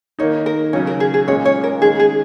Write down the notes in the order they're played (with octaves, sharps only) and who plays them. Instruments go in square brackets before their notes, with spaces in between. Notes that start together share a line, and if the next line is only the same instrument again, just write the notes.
[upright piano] D#3 A#3 D#4 [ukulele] C#5
[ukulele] A#4
[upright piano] C#3 F#3 C#4 [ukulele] C#5
[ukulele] A#4
G#4
G#4
[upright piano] A#2 G#3 C#4 [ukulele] C#5
[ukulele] C#5
A#4
[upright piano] D#3 G#3 C#4 [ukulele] G#4
[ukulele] G#4